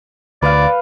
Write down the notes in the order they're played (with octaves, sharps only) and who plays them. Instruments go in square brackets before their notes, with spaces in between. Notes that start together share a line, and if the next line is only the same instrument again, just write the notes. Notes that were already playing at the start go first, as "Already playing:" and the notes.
[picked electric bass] D2 [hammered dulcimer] B4 F5 [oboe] D5